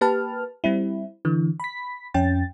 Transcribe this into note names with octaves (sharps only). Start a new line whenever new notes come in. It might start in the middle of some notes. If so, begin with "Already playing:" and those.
A#3 G4 B4 A5 F6
G3 C4 E4
D3 E3
B5 B6
F2 C#4 G5 A6